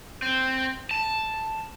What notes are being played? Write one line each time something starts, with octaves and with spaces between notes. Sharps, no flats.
C4
A5